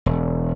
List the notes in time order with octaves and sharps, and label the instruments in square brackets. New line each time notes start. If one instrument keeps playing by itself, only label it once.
[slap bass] E1